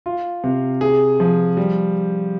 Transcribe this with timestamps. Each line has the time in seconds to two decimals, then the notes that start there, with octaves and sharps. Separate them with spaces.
0.06 F4
0.44 C3
0.81 G#4
1.20 F3
1.57 G3